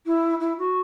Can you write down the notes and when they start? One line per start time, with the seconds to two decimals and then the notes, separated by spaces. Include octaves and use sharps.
0.06 E4
0.40 E4
0.58 F#4